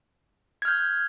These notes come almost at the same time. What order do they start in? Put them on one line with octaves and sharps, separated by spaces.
G#6 F6 G6